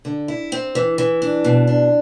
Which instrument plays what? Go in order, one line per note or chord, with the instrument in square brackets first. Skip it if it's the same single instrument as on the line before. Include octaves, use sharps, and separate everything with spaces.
[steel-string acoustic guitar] D3
E4
C4
E3
E3
D4
B2
D4